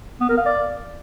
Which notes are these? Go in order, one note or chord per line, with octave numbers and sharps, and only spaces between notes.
B3
A#4
F5
D5